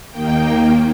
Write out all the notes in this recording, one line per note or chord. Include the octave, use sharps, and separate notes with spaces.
D#2 D#3 A#3 G5